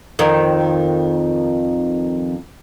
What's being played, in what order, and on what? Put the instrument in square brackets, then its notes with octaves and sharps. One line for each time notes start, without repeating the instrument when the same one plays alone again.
[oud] F2 D#3